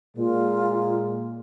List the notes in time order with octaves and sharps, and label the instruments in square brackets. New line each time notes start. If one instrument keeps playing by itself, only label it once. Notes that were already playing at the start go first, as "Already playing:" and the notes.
[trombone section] A#2 G#3 [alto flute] F4